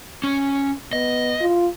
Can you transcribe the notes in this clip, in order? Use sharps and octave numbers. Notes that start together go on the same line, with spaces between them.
C#4
B3 D#5
F4